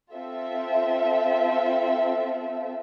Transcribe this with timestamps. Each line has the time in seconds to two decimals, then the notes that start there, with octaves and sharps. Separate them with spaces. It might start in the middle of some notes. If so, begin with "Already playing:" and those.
0.15 C4 F4 A4 E5